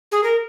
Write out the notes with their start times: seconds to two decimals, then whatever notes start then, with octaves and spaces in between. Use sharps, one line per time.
0.12 G#4
0.24 A#4